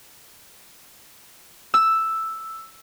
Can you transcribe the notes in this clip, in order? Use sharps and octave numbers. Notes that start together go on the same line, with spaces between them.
E6